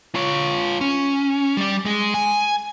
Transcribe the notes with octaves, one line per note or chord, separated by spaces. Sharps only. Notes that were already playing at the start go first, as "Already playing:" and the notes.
F4 C#5
C#4
G3 D5
G#3 G#4
G#5